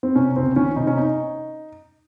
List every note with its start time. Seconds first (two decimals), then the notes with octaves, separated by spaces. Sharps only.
0.03 C4
0.15 C3 C#4
0.36 C#2 C4
0.56 D#3 C#4
0.76 C3 D#4
0.87 C#4
0.97 D#4